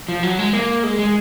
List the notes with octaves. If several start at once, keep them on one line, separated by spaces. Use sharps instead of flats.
F3
F#3
G#3
A#3
G#3
G#3